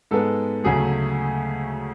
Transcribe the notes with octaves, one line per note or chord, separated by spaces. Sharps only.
G#2 G#3 B3 A4
D2 C#3 F#3 A3 G#4